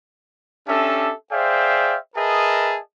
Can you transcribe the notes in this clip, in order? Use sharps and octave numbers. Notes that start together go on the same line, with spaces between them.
C#4 D4 G4 A4 E5
G#4 C5 D5 E5 F5 G5
G#4 A#4 B4 D#5 E5 A5